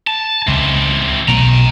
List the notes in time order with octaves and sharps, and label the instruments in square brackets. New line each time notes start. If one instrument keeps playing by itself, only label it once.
[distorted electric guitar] A5
[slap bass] C#2 [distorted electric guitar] E3 C4
[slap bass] B1 B2 A3 [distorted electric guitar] G5 A#5